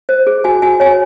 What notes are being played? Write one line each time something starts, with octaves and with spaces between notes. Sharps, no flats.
C5
G#4
F#4 G#5
F#4 G#5
C#5 G#5